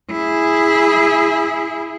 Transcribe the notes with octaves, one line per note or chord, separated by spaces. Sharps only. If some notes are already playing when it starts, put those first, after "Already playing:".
E4 G#4